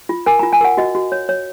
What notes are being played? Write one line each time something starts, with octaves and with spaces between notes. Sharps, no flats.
F4
A#4 G#5
F4 A#5
G#5
A#4 F#5
F#4 D#5
F#4
C#5
C#5